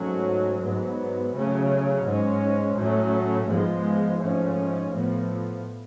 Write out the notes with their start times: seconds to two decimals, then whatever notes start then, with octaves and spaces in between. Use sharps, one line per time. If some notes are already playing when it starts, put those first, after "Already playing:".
Already playing: G#2 F#3 A3 C#4
0.62 G#2 F#3 B3
1.33 C#3 F#3 A3 C#4
2.04 G#2 G#3 C#4
2.76 A2 F#3 A3 C#4
3.48 G#2 F3 G#3 B3
4.19 G#2 F3 A3 C#4
4.91 A2 F3 B3